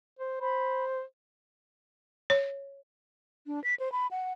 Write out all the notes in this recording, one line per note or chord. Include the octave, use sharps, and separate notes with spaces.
C5
C5 B5
C#5
D4
B6
C5
B5
F#5